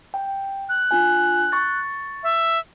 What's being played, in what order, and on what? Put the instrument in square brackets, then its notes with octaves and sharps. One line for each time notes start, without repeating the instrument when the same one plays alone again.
[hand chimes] G5
[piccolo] F#6
[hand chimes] D4 F4 G#5
C#6 A6
[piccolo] E5